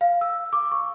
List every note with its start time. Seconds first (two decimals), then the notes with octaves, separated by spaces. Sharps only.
0.01 F5
0.21 E6
0.53 D6
0.72 C#6